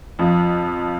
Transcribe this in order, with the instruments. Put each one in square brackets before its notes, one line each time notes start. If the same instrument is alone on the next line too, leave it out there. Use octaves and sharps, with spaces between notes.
[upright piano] F2 F3